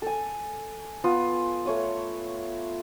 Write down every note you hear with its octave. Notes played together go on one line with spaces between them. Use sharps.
A4 G#5
B3 F4 D#6
A3 C#5 D#6